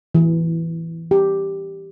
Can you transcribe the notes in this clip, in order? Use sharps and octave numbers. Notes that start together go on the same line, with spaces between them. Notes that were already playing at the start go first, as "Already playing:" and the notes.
E3
G4